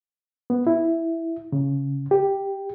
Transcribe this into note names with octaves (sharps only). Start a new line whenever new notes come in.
B3
E4
C#3
G4